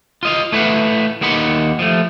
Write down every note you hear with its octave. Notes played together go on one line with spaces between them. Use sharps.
F4 D#5 F5
A3 E4 B4 F5 F#5
D#2 A#3 D#4 F#5 B5 C6
F3 A3